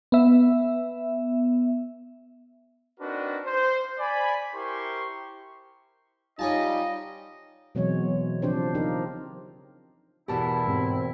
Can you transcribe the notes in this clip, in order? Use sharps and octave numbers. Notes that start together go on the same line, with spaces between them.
B3 E5
C4 D4 D#4 F#4 A#4 B4
C5
D5 G#5 B5
E4 G4 A#4 C5 C6 C#6
G3 D#4 F4 C#5 D#5 G#5 A5
B2 E3 F#3 G#3 C4 C#5
C#3 F3 C4 D4 G4 C5
D4 D#4 F4 G4 A#4
E2 B2 E4 G4 A#4 A5
G#2 C4